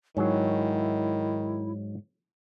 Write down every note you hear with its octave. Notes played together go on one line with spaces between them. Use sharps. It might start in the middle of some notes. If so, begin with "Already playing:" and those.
G#2 D#3 F#3 E4 G#4 C#5